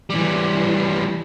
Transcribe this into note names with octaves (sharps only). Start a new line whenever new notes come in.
E3 G3